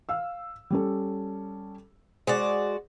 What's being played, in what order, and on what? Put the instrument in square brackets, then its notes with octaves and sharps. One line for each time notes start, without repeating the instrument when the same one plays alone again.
[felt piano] F5 E6
G3 C#4 A4
[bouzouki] G#3 F#4 D5 [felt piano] C5